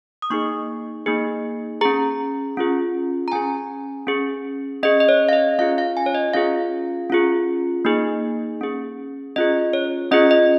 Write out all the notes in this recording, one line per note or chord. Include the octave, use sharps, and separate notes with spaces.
D#6
A#3 D#4 G#4 C#6
A#3 D#4 G#4
C#4 G#4 A#5
C#4 F4 G#4
A#5
C#4 G#4 G#5
C#4 G#4
C#4 G#4 D#5
D#5
C#5
F5
D#5
C#4 F4 G#4 F5
F5
G#5
C#5
D#5
C#4 F4 G#4 F5
C#4 F4 G#4
A#3 D#4 G#4
C#4 G#4
C#4 F4 G#4 D#5
C#5
C#4 F4 G#4 D#5
D#5